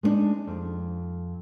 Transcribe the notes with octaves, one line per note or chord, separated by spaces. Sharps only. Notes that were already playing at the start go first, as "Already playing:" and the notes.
G#3 B3 D4 D#4
F2